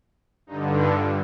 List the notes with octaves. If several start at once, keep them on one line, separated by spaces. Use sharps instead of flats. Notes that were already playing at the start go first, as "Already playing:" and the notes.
G2 D3 D#4
D4 F4